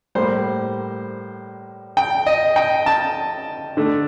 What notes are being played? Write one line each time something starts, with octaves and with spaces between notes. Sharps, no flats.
A2 G3 A#3 C5
G5
D#5
G5
A5
D3 A3